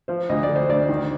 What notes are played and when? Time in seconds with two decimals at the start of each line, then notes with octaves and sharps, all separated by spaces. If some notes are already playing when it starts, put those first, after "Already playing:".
0.08 F3 C5
0.29 D2 D#5
0.43 D5
0.49 D3
0.56 C5
0.69 D2 D5
0.89 D#3